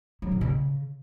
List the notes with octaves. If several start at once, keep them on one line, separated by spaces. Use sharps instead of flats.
F#3
A2
C#3